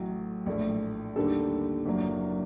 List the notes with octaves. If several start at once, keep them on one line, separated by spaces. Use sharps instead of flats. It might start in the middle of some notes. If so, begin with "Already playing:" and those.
Already playing: A1 A2 F#3
A#1 A2 A3
D#2 D3 G3 D4 A4
F#1 F#2 F#3 A#3 D4